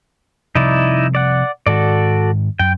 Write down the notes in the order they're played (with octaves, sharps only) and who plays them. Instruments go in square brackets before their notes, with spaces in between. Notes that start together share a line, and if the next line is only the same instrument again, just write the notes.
[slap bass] C3 F3 G3 [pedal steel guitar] D#4 E4 D5
[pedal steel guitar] D5 F#5
[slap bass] G#2 D#3 [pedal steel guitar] F#4 A4 D5
[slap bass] F#2 [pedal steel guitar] G5